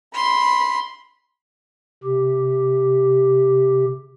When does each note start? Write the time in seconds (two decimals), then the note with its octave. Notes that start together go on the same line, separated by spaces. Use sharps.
0.15 B5 C6
2.04 C3 G4